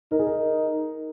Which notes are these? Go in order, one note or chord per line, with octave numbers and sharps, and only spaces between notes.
D#4 A#4
G#4
A#4